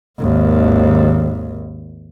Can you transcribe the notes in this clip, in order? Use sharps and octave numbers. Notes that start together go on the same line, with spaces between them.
G#1 D#2